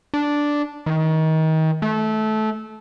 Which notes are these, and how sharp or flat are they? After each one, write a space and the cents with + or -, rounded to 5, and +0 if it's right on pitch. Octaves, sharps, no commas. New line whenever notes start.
D4 -5
D#3 +30
A3 -20